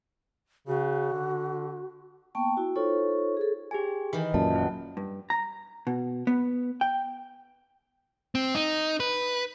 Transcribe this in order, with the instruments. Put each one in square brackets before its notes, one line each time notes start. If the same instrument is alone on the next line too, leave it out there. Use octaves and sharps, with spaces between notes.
[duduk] C#3 [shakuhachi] F#4
[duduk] D3
[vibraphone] A#3 B3 G5 A5 C#6
E4 F#4
D#4 F4 A4 C5 C#5 C#6
G#4 A4
[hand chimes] G4 G#4 G#5
[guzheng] D#3 E3
[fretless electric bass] F#2 A#2 [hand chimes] A5
[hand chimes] E4 F#5
[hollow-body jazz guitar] G2
A#5
B2
B3
G5
[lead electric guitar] C4
D#4
B4